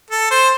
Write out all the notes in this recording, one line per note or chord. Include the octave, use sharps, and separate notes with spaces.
A4
C5